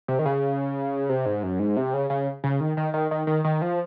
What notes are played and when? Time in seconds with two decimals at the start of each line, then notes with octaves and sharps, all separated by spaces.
0.08 C3
0.19 D#3
0.26 C#3
1.09 C3
1.26 G#2
1.43 F#2
1.59 G#2
1.77 C3
1.94 C#3
2.10 C#3
2.44 C#3
2.60 D#3
2.77 D#3
2.94 D#3
3.11 D#3
3.27 D#3
3.45 D#3
3.62 F3